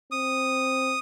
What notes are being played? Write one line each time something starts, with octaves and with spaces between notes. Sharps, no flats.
C4 D#6